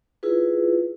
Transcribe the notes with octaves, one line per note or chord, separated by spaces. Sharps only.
E4 F4 G#4 B4